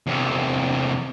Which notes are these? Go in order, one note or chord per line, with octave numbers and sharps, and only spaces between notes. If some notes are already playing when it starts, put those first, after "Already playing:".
E2 C3